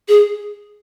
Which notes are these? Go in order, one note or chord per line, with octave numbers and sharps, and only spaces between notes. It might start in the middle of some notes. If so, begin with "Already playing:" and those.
G#4